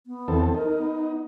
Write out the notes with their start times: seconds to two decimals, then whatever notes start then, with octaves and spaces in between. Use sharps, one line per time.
0.07 B3
0.28 E2 C4 A4
0.54 D#4 A#4
0.78 B3